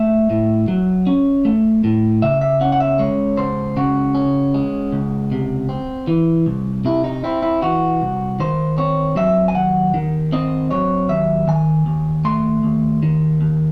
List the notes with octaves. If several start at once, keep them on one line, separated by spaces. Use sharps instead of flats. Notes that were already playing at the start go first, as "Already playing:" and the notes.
Already playing: A3 E5
A2
F#3
C#4
A3
A2
C#3 E5
E5
C#4 F#5
F#5
E5
G#3 C#5
C#2 C5
C#3 F#4
C#4
G#3
C#2
C3
C4
E3
C2
C3 E4
D#4
C4 E4
E4
E3 F#4
C2
D#3 C5
C4 C#5
F#3 E5
G#5
D#2 F#5
D#3
C4 D#5
F#3 C#5
D#2 E5
D#3 G#5
D#2
A3 C6
D#2
D#3
D#2